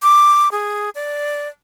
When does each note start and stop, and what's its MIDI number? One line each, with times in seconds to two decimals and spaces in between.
0.03 0.49 86
0.52 0.90 68
0.95 1.48 74